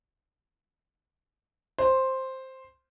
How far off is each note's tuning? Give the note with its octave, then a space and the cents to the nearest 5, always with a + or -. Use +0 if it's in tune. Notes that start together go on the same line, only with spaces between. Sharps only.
C5 +5